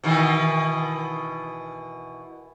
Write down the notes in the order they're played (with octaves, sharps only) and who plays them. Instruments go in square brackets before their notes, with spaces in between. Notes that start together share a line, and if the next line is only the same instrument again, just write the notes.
[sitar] B2 D#3 E3